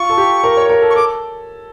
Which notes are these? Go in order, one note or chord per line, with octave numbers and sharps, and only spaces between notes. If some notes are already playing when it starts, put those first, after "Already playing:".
Already playing: F4 C#6
A4
G4
A#4
C#5
A#4
A4
C#6
A4 D6